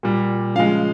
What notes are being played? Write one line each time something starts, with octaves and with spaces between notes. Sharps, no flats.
A#2 G3
C#3 F3 G#3 F5